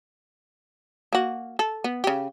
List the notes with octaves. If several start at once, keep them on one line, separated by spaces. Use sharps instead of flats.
A#3 F#4
A4
B3
C#3 G4